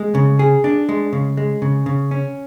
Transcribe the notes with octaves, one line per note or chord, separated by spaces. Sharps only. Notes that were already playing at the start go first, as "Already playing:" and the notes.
Already playing: G#3
C#3
G#4
D4
G#3
C#3
G#3
C#3
C#3
C#4